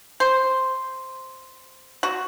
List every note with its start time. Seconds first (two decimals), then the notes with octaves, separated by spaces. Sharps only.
0.20 C5
2.03 F#4